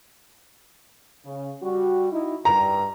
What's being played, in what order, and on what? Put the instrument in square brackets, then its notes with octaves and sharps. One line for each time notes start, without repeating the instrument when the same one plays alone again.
[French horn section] C#3
G3 F#4
D#4 E4
[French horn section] G2 [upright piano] A#5